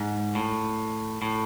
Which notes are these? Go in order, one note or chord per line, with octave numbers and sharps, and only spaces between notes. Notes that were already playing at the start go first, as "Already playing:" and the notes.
Already playing: G#2
A2
A2